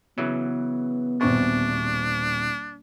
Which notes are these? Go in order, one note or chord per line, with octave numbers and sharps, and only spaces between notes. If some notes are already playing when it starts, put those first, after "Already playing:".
C#3 E3 F#3 B3
D#1 E2 B2 C4 D4 C#6